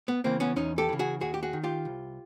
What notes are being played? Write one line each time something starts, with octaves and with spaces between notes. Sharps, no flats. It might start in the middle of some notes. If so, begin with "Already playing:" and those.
B3
C#3 E3 A#3 C4
B3 C#4
E2 C#4 D#4
G4 A4
C#3 E3
F#4 G#4
D#2 F#4 G#4
G4
F#4 G#4
D#3
F4 G4
C2